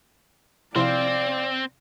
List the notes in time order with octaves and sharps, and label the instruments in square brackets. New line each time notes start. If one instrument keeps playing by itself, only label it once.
[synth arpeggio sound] C3 F3 E4 [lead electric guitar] C4 [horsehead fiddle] D5 [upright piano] F5 C6